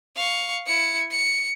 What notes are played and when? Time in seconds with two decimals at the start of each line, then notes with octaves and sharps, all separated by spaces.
0.16 F5 C#6
0.66 E4 C#7
1.11 C#7